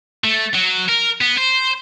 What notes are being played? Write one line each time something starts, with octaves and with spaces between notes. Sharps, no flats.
A3
F#3
A#4
B3
C5